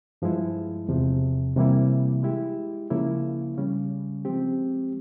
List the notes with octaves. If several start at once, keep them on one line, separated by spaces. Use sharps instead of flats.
G2 F3 G#3 E4
E2 C3 F3
C3 E3 G3 A#3 E4
G#3 E4 G4
C#3 F3 A#3 E4
C#3 G3 C#4
F3 G#3 C4 G4